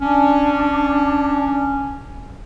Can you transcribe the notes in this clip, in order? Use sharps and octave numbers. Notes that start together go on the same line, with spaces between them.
C#4 D4